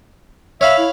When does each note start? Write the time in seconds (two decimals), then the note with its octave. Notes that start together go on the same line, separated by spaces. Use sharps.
0.61 C#5 E5 F5 B5
0.78 E4